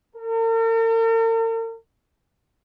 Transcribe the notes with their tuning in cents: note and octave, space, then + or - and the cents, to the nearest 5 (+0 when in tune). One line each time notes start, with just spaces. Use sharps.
A#4 -45